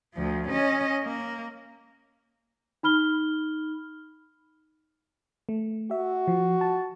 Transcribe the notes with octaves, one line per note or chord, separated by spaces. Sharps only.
D2 F3
C#4 D#5
A#3
D#4 B5 F6 G7
A3
F#4 E5
F3
A5